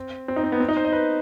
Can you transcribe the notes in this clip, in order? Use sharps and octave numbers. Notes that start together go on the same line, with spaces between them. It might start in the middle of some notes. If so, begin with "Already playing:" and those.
Already playing: C4
C4
D#4
C4
B3
C4
D#4
C5
D#5
B4